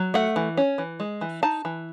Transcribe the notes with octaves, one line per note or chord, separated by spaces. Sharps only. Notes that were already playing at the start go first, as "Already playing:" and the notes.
Already playing: F#3
A3 F#5
E3
C#4
E3
G#3
E3
D#4 A5
E3